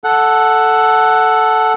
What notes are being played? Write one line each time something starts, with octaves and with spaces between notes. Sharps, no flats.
A4 F#5